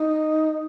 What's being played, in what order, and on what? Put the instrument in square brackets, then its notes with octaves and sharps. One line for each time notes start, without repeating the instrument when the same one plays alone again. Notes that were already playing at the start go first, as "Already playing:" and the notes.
Already playing: [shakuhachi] D#4